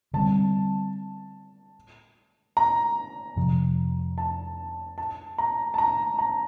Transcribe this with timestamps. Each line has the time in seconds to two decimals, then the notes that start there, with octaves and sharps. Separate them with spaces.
0.14 D3 G3 C4 A5
2.57 A#5
3.36 F2 C3 F3
4.18 A5
4.98 A5
5.38 A#5
5.74 A5
5.78 A#5
6.19 A#5